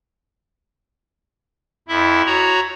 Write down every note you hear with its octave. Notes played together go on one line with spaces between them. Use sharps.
F2 E4 E5
F#4 C#5 A#5